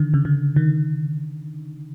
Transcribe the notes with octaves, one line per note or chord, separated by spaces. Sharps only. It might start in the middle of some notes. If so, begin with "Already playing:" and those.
Already playing: D3 D#3
C#3
D3
D#3